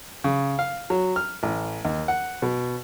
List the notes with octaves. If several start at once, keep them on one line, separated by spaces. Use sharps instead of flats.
C#3
F5
F#3
F6
A1
D#2
F#5
B2